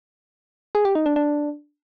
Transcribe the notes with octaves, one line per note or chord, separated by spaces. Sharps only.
G#4
G4
D#4
D4
D4